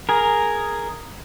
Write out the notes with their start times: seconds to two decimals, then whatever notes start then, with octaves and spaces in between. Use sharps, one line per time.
0.09 G#4 A#4